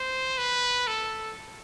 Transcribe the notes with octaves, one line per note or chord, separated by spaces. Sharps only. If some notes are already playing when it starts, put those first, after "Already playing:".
Already playing: C5
B4
A4